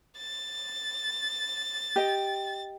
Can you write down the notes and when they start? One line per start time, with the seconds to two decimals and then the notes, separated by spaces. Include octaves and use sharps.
0.18 A6
1.96 G4 D#5 G5